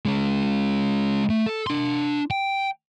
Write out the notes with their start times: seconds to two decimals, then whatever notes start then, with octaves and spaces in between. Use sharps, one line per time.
0.06 G#3 C#4
1.30 A3
1.46 A4
1.67 D4 C6
2.31 G5